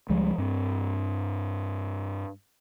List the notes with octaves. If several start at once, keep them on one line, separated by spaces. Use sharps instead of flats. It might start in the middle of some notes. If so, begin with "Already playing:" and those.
C#2 F3 G3 G#3
G2 C4